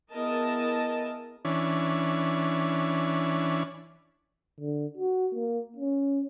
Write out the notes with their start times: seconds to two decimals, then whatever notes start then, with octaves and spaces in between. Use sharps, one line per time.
0.13 B3 E4 G#4 A#4 D#5 A5
1.45 E3 C#4 D4
4.60 D3
4.98 F#4
5.34 A#3
5.76 C#4